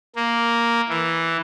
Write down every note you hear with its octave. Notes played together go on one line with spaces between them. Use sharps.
A#3
E3